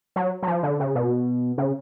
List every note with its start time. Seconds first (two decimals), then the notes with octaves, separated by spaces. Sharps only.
0.16 F#3
0.42 F#3
0.47 F3
0.63 D3
0.80 C#3
0.95 B2
1.58 C#3